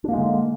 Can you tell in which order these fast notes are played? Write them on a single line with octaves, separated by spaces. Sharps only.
D4 A#3 G#3 D3